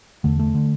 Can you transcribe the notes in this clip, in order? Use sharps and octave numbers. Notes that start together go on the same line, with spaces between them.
E2 D3 A3
A3
D3